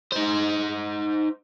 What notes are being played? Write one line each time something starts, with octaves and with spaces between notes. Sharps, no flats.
D#4 C5